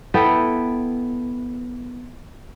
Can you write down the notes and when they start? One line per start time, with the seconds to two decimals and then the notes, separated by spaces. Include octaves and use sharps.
0.14 B3 E4 A4 G5